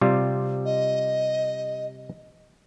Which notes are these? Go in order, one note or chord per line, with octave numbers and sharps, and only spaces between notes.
C3 G3 F4
D#5